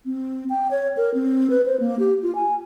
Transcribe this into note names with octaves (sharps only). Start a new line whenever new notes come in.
C4
G5
C#5
A#4
C4
B4
C5
A#3
G4
F4
G#5